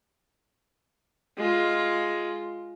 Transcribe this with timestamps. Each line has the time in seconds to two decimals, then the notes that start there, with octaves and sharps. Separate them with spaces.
1.38 G#3 F4